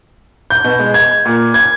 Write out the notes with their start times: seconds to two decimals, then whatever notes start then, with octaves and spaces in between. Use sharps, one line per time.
0.50 G6
0.64 B2
0.79 G#3
0.94 G#6
1.25 A#2
1.54 G#6